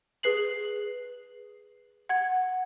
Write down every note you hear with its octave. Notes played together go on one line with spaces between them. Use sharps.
G#4 B4 C7 F#7
F#5 G#6